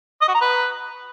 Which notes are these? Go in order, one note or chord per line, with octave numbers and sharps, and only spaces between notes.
D#5
F#4
A#5
B4